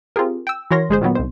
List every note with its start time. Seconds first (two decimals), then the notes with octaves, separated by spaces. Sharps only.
0.16 C4 F4 G4 G#4 A#4
0.47 G5 E6
0.71 E3 F#4 A#4 C#5 C6 A#6
0.89 G1 G#3 G#4 C5
1.01 A#2 D#3 F#3 B3
1.15 C2 D#3 C5